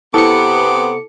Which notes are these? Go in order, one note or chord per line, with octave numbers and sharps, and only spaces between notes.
C3 B3 E4 A4 D6 C#7